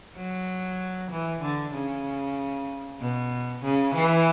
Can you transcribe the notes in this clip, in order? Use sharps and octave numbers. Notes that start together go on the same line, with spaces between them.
F#3
E3
D3
C#3
B2
C#3
E3